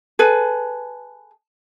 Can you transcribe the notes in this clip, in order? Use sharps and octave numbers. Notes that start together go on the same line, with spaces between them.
G#4 A4 B4